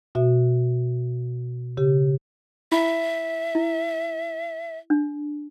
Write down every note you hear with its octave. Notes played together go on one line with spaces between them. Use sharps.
B2 F#4 E5
C#3 G4
E4 E5 B5
E4
D4